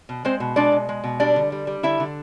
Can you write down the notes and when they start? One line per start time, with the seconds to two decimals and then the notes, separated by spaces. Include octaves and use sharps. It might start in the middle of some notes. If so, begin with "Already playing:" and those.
0.09 B2
0.25 G#3 C4 C5
0.40 B2
0.56 G#3 D4 D5
0.72 B2
0.89 G#3
1.04 B2
1.20 G3 D4 D5
1.36 D3
1.52 G3
1.67 G3
1.83 D3 E4 E5
2.00 D3